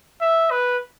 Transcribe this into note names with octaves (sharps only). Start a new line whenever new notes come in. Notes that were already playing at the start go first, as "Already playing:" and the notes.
E5
B4